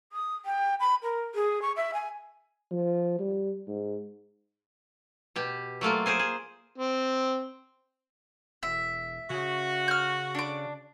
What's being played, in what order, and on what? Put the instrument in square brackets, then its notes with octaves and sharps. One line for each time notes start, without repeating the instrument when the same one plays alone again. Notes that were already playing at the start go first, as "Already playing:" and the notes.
[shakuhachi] D#6
G5
B5
A#4
G#4
C#6
E5
G#5
[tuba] F3
G3
G#2
[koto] B2 G4
F#3 A3 A#3 F4
G#4 A#4 C5 G#5
G#4
[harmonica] C4
[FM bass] E1 [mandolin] E5
[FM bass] C#3 [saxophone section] F#4
[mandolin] F6 G6
D4 D6